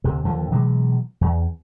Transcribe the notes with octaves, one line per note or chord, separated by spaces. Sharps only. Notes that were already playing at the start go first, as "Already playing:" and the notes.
D2 C3
D#2 D3 F3
B2 E3 F#3 G#3
E2